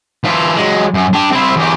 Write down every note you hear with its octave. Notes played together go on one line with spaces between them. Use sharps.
E3 F4
F#3 G#3
F#2
D4 G4
C4 E4
E2 G4